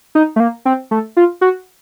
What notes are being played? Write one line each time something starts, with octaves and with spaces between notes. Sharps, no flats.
D#4
A3
A#3
C4
A3
F4
F#4